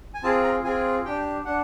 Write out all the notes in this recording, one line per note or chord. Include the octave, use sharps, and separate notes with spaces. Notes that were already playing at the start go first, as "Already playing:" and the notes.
G#5
C4 F4 G#4 A5
A#5
C4 F4 G#4 G#5
D4 G4 G5
D4 F#5